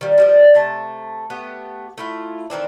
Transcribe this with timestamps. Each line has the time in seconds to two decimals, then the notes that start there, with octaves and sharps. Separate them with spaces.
0.01 D#3 F3 G3
0.18 F3 G3 D4
0.54 C3 A3 A5
1.30 A3 B3 G4
1.98 A3 E4 F4
2.50 D#3 E3 C4 D4